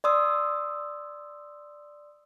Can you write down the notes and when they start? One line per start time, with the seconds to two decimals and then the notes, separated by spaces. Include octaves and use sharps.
0.04 D5 C6 D#6 E6